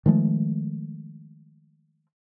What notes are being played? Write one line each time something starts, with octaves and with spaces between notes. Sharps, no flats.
D#3 F3 G#3 A3